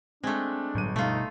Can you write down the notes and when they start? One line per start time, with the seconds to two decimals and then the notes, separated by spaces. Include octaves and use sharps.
0.24 G#3 A3 C4 D4
0.75 G1 A2 F#3 G3 D#7
0.96 B2 G3 A3 D#4 F4